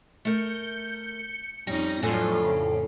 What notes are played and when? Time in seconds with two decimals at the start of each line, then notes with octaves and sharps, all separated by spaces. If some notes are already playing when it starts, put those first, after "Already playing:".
0.25 A3 A#4 G6 C#7
1.67 F2 G3 C#4 D#4 A#6
2.03 F2 A2 F#3 D4 F4 A4 G#5
2.44 C#3